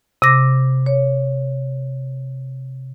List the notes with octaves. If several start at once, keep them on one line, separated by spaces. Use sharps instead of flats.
C3 D6 A#6
C#5